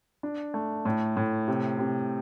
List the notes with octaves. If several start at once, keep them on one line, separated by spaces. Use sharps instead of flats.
D4
A3
A2
A2
C3
C3